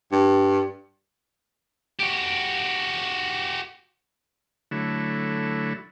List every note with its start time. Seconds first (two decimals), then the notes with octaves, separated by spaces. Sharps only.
0.12 G2
2.00 F#4 G4
4.71 D3 F#3 A3 E4